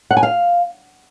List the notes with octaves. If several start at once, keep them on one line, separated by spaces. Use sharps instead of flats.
F#5
G#5
F5